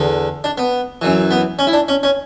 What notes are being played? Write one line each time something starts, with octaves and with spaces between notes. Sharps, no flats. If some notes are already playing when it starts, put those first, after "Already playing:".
Already playing: E2 D3
D4
B3
F#2 E3
B3
C#4
E4
D4
C#4
C#4